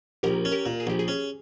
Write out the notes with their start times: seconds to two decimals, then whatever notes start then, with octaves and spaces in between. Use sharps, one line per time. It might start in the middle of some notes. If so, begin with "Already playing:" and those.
0.23 A#1 G4 A#4
0.45 C#4
0.52 G4 A#4
0.66 A#2
0.80 G#4
0.87 A#1 G4
0.99 G#4
1.08 C#4